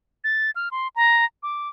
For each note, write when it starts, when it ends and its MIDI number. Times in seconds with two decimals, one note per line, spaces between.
0.24 0.51 93
0.56 0.69 89
0.71 0.88 84
0.96 1.25 82
1.43 1.69 86